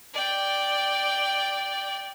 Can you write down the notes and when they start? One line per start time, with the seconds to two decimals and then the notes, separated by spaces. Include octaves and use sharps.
0.14 D5 G5